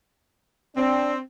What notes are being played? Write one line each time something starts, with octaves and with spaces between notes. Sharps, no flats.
C4 D4